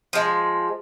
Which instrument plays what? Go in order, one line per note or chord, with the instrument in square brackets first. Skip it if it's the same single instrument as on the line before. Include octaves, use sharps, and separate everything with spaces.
[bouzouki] F3 G#3